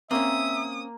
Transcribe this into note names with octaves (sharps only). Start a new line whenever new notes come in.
A#3 C4 C#4 E5 D#6